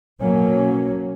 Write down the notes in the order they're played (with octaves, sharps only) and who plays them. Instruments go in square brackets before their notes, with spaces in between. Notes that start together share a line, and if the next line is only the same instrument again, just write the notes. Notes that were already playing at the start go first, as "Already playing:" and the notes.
[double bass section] B2 F#3 A#3 C#4